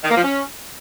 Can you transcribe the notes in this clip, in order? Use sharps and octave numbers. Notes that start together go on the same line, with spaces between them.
D#3
A#3
F3
C#4